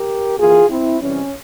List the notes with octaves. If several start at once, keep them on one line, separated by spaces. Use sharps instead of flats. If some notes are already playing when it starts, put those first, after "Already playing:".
Already playing: G4 A#4
E3 A#3 F4 G#4
C4 E4
C3 E3 G3 C4 C#4